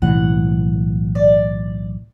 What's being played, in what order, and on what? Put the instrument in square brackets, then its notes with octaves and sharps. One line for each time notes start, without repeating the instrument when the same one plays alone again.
[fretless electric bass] B1 A2 E3 [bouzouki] F#5
[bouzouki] D5